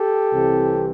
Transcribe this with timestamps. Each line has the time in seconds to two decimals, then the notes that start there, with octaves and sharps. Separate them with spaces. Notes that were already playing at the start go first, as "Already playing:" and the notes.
Already playing: G4 A4
0.32 C2 C3 E3